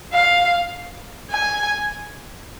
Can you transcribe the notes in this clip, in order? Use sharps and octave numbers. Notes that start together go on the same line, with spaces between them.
F5
G#5